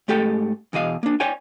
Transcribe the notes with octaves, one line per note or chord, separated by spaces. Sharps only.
G#2 A3 G4 A4 G5
E2 B2 D#5 F5
A#3 D4
C#5 D5 G5 G#5